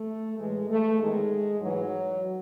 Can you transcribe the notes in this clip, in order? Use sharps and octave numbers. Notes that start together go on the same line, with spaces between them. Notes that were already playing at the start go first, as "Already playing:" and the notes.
Already playing: A3
A2 E3 G#3
A3
E2 D#3 G#3
G#2 E3 F#3